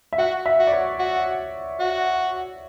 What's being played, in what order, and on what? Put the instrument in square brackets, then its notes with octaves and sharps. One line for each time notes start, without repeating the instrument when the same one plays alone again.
[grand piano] E5
[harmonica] F#4 [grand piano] F#5
[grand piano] E5
[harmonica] F#4
[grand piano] D5
C#5
[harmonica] F#4
F#4